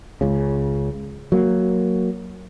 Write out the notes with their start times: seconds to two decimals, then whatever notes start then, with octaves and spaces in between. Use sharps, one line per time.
0.21 C#2 C#3
1.32 F#3 A#3